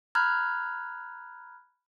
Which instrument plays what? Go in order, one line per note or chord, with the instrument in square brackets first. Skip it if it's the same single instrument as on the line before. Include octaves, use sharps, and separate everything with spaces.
[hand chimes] A#5 B5 F6 F#6 G#6